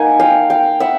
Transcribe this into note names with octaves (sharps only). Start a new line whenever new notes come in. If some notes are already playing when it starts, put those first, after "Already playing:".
Already playing: A#3 D#4 F#5 G#5
F5 G5
F5 G5
E5 F#5